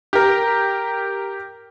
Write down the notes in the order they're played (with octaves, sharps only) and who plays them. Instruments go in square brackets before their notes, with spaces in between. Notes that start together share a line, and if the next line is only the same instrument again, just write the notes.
[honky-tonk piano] G4 A#4